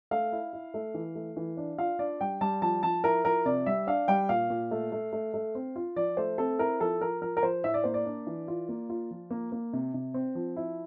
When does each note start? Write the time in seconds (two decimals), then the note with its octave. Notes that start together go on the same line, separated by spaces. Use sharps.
0.11 A3 F5
0.32 E4
0.53 E4
0.74 A3
0.94 E3
1.15 A3
1.37 E3
1.57 D4
1.78 F4 F5
1.99 D4 D5
2.21 G3 G5
2.41 G3 A5
2.62 F3 A5
2.83 F3 A5
3.04 E4 A#4
3.25 F3 A#4
3.46 C3 D5
3.66 G3 E5
3.87 D4 F5
4.08 G3 G5
4.29 A#2 F5
4.50 A#2
4.71 A3
4.92 A3
5.13 A3
5.34 A3
5.55 C4
5.76 F4
5.96 F3 D5
6.17 A3 C5
6.38 C4 A4
6.59 E4 A#4
6.80 F3 A4
7.01 F3 A#4
7.22 F3 A#4
7.37 A#4
7.43 F3 C5
7.64 A2 E5
7.74 D5
7.84 A#3 C5
7.94 D5
8.06 D4
8.27 E3
8.48 F4
8.69 A#3
8.90 F4
9.11 F3
9.31 A#3
9.52 A#3
9.73 C3
9.94 C3
10.14 C4
10.35 F3
10.56 E4